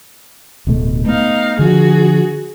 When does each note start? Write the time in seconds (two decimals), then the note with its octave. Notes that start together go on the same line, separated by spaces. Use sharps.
0.67 D1 B2 A3
1.06 A3 B3 D#4 F5
1.59 D3 F3 F#4 G#4